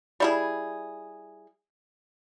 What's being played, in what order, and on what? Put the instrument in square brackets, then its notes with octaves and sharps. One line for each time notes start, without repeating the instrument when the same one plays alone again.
[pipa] G3 E4 G#4